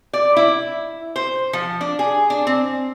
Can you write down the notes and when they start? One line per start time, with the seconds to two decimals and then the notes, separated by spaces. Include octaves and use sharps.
0.13 D5
0.36 E4
1.16 C5
1.53 F3
1.81 D4
1.99 G#4
2.30 D4
2.47 C4